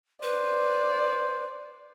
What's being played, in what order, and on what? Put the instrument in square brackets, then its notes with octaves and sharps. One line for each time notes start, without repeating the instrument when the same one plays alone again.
[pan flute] B4 [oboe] C5 [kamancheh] D5